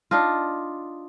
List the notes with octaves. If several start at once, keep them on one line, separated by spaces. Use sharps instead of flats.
D4 D#4 F4